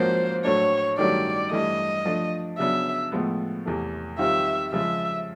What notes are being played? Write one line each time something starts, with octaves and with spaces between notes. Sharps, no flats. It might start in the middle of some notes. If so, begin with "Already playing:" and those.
Already playing: G#2 F3 A#3 C#4 F#4 C5
A2 F#3 A3 D4 C#5
G2 D#3 F#3 A3 C#4 D5
G2 E3 A3 D#5
F3 A3 D4
C#3 F#3 B3 D4 E5
A2 F3 G#3 B3
E2 C3 E3 A3
D#3 G3 C4 F4 E5
C#3 F3 G#3 E5